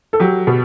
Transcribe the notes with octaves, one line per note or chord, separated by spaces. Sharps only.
A4
F#3 G4
B2